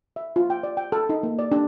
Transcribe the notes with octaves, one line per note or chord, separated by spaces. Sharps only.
E5
F4
G5
D5
G5
A4
D#4
A#3
D5
D4